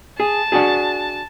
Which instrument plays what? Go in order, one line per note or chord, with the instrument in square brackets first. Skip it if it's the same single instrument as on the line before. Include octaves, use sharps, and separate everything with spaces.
[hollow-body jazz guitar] G#4 [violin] A5
[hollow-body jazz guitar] D4 F#4 G#4